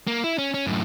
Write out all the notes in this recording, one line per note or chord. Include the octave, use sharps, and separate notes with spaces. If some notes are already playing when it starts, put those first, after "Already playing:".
A#3
E4
C#4
C#4
F#2 A2